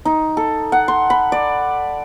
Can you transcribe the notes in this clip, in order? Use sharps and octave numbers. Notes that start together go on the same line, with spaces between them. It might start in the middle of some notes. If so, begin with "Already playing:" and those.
D#4
A4
F#5
C6
B5
D5